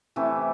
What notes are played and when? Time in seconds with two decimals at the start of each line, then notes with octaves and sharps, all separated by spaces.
0.16 C3 E3 A3 E4